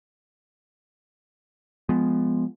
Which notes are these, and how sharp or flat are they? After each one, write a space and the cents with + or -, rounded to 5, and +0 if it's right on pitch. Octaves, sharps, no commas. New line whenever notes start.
F3 +0 G#3 +0 B3 +20